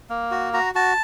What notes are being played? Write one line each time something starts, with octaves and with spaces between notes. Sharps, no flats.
A#3
F#4
F#4 A#5
F#4 A5